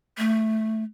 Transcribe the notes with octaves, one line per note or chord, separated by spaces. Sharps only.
A3